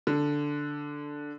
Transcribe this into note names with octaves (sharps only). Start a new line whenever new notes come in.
D3